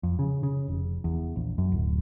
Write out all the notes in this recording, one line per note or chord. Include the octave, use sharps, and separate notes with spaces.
F2
C#3
C#3
F1
E2
A#1
F#2
D1